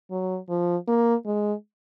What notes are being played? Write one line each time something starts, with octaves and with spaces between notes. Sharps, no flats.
F#3
F3
A#3
G#3